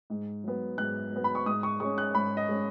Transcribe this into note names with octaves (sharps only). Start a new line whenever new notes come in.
G#2
F#3 B3
G#2 F#6
F#3 B3
B5
C#6
G#2 D#6
C#6
G#3 C#4 C#6
F#6
G#2 B5
D#5
G#3 C#4